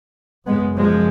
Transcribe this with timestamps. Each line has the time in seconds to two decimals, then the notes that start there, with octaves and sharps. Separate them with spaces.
0.47 F#2 C#3 G#3 B3
0.76 F3 G#3